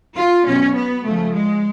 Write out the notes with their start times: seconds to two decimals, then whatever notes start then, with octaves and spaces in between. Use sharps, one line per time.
0.17 F4
0.46 B2 F#3 C#4
0.75 B3
1.05 C#3 F3 A3
1.34 G#3